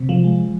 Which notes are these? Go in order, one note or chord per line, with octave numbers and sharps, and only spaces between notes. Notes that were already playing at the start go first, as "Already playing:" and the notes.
Already playing: C3
F3
G#3